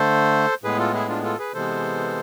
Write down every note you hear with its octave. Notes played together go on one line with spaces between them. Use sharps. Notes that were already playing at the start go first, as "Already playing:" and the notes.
Already playing: D3 A3 A4 C5
A2 G#3 B3 G#4 B4
F4 A4
E4 G#4
D4 F4
F4 A4
G#4 B4
C3 E3 G#3 B3 A4 C5